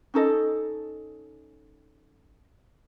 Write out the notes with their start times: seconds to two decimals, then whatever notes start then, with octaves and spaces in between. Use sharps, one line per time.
0.14 C#4 D#4 A4 D#5